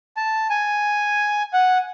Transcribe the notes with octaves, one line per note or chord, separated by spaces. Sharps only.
A5
G#5
F#5